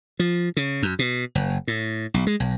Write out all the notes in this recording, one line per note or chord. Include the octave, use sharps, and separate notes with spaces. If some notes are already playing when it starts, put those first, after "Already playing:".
F3
C#3
F#2
B2
F#1
A2
B1
G#3
B1